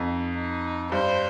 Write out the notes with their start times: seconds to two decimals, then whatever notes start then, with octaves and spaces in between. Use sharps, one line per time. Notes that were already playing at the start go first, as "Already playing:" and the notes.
Already playing: F2 D#4
0.36 D#4
0.92 G2 C5